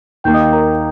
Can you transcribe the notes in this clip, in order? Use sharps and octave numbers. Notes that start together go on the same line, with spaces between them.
D#2 D#3 A#3 G5 G6
D#5 D#6
A#4 A#5